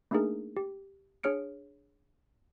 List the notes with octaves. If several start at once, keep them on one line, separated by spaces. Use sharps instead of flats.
A3 A#3 D4 D#4 G#4 A#4
G4
D4 G#4 C#5 F6 C#7 D7